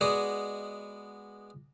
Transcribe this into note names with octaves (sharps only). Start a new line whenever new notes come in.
G#3 B3 F#4 G#4 D5 D#5